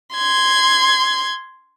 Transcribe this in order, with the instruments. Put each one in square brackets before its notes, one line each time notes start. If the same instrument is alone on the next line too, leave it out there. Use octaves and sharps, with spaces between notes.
[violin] C6 G#6